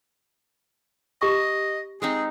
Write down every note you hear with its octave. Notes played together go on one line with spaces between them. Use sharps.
G4 D#5 A#5 C#6
G#3 C4 D#4 G#4